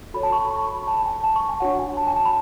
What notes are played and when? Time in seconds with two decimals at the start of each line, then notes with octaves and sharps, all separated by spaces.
0.14 F#4 A4 C#5 B5
0.23 A5
0.32 C#6
0.42 B5
0.51 C#6
0.69 B5
0.88 A5
1.06 G#5
1.24 A5
1.36 C#6
1.49 G#5
1.60 D4 F#4 C#5 F#5
1.79 G#5
1.97 A5
2.07 G#5
2.16 A5
2.25 B5